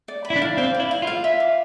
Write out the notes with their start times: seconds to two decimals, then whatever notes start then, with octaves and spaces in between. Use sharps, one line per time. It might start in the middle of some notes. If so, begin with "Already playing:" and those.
0.08 D5
0.25 B5
0.30 E4
0.36 D4
0.42 F5
0.57 C4 D5
0.74 D5
0.80 E4
0.91 F5
1.02 F4 F5
1.24 E5
1.40 D6